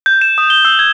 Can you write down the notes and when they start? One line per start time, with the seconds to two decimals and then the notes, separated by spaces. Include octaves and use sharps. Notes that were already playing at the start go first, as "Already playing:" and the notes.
0.06 G6
0.21 E7
0.38 D#6
0.50 G7
0.65 E6
0.79 G#6